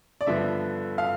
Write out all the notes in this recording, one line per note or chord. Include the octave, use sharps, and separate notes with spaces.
D5
G2 D3 F3 B3 E5
F5